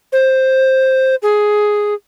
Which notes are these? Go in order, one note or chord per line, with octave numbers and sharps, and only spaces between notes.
C5
G#4